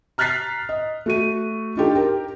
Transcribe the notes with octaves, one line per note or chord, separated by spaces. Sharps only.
A#5 F6 F#6 A6 B6 C7
D#5
A3 F#4 D#7
D4 D#4 F4 G4 A4
G4 A#4